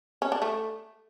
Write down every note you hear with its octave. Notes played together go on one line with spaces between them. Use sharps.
C#4
D4
A3